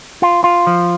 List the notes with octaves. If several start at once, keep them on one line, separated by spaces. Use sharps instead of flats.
F4
F4
F3